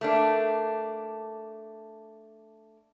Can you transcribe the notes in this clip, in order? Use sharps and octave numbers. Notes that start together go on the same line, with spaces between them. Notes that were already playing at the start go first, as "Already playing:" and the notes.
A3 A#3 D4